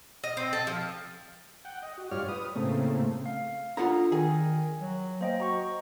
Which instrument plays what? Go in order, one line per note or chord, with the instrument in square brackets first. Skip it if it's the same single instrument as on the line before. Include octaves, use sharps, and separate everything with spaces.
[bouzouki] D#5
C4
A4
F3
[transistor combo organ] F#5 G5
D#5
F#4
G2 F4 G4 C#5 D5 F6
B4 D#6
A2 C#3 A3 A#3 C4
[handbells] F5
[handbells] D4 A4 [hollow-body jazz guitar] F4 F#5 A#5
[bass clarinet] D#3 [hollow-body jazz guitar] G#4 [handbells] G#5
[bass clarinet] F#3
[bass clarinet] A#3 [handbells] C5 D#5 G5
[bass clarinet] F#4 [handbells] A#5 C#6